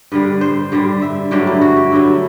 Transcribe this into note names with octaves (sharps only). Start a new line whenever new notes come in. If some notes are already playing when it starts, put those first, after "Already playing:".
G2 D3 G3 B4
C5
G2 D3 G3
E5
G2 D3 F#3 A3 G4
E4
F#4
G4
G2 D3 F#3 A3 E4